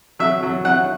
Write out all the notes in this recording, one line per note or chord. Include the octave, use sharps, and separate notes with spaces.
F#3 E5
F#3
F#3 F#5